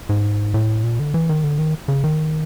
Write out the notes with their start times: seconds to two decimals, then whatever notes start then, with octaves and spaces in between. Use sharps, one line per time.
0.09 G#2
0.54 A2
0.84 A#2
0.99 D3
1.14 E3
1.29 D#3
1.44 D3
1.59 D#3
1.88 C#3
2.04 D#3